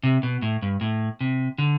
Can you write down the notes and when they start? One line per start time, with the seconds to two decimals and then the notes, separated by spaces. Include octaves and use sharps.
0.03 C3
0.23 B2
0.42 A2
0.62 G2
0.81 A2
1.21 C3
1.58 D3